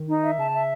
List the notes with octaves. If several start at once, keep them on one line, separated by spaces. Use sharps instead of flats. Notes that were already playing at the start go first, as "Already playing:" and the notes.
Already playing: D#3
D#4
E5
C#3 A5
E5